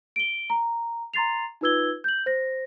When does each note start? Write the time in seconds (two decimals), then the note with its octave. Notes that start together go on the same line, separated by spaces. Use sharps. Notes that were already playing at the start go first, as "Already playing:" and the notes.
0.16 D7 G7
0.50 A#5
1.14 A#5 C6 A6 C7 F7
1.61 D#4 F4 B4 E6 G#6 G7
2.04 G6 F#7
2.26 C5 A#6